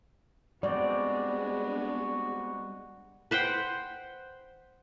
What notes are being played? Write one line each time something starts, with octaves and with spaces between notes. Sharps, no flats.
G3 G#3 B3 C4 D4 F#4 G#4 D5
B4 C5 F#5 G5